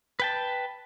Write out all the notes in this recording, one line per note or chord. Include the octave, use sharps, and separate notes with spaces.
B4 G5 A5